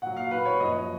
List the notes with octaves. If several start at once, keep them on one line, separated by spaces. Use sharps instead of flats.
A#2 F#3 F#5
F5
B4
C#5
F#2 F3 D#5